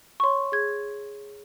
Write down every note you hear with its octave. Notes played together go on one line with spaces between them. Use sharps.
C#6
C#5 C6
G#4 G#6